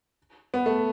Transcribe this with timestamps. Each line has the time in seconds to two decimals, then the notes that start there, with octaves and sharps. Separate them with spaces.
0.54 B3
0.66 A3